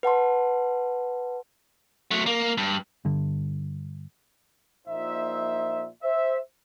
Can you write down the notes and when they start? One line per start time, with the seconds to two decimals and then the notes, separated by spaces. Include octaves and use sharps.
0.03 B4 F#5 A5 C6
2.11 F#3 A3
2.26 A#3
2.57 G2
3.05 G2 D3
4.87 A#1 A#2 D#4 C5 E5
6.03 C5 E5